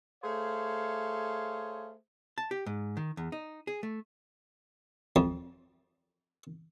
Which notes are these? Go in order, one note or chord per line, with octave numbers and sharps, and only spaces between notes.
A3 G#4 C5 C#5 F5
A5
G4
G#2
D#3
E2
D#4
G#4
A3
F2